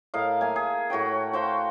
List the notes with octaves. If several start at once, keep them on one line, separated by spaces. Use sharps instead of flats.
A2 A#4 D#5 F5
A#3 E5 G#5
G#4
A2 F#4 C#5 G5
F#4 C5 F5 G5